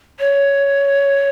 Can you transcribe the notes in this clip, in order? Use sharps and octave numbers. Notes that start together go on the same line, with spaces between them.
C#5